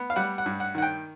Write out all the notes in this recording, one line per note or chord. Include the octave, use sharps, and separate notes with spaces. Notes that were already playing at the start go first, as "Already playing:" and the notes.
Already playing: B3
F5
G3 F#5
F#5
G2
F#5
D#3 F#5
G5